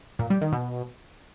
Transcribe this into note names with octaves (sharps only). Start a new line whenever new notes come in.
A#2
G3
D#3
B2